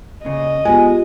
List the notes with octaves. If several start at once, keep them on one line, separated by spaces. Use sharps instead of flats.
A#2 C#3 D#5
G#3 B3 F4 G4 G#5